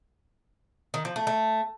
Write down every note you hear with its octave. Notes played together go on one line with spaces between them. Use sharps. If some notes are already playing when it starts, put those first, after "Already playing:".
D#3
F3
A3
A3